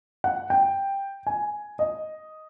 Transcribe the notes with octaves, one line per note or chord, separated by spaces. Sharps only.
F#5
G5
G#5
D#5